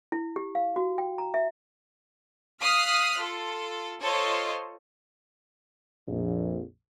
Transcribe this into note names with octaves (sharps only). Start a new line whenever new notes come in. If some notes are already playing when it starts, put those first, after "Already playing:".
E4
G4
F5
F#4
G5
A#5
E5
F5 D#6 F6 F#6 B6 C7
F4 A4
F4 A4 C5 C#5 D#5
A#1 F2